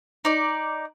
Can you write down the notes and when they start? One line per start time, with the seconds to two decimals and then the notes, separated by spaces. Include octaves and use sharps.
0.25 D#4 D5